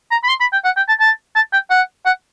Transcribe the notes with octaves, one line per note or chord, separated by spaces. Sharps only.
A#5
B5
C6
B5
G5
F#5
G5
A5
A5
A5
G5
F#5
F#5